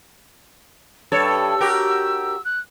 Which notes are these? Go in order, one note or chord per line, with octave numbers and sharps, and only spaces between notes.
G2 A4 C#5 E6
F#4 G4 A#4
F#6